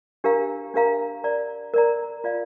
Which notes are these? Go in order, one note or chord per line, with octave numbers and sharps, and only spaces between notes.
D4 G4 A#4 F5 A#5
D4 G4 A#4 F5 A#5
A#4 D5 A#5
A#4 D5 A#5
F4 D5 F5